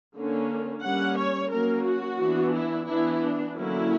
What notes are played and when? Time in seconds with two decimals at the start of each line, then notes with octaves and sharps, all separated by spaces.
0.16 D3 A#3 C#4
0.84 G3 A#3 C#4 F#5
1.18 C#5
1.52 F#3 A#3 C#4 A#4
1.85 F#4
2.20 E3 B3 D4
2.55 E4
2.88 E3 B3 D4 E4
3.22 D4
3.56 D3 F#3 A#3 C#4 E4